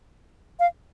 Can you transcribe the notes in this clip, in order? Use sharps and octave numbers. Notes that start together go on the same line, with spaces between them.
F5